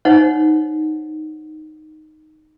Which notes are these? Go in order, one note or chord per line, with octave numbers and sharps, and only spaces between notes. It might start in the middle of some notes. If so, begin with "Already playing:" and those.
D#4 C5 C#5 F#5